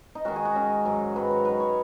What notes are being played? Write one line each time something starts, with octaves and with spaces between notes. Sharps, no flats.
D#4
D#3 G#3 C#4 F#4
G#4
F#4
D#3 G#3 C#4
G#2 D#3 F#3
G#2 D#3 F#3 B4
C#5
D#3 F#3 D#4 B4
C#5